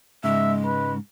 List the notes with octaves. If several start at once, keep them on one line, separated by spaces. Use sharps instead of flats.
G#2 C#3 G#3 E5
B4